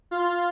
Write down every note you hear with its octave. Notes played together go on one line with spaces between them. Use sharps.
F4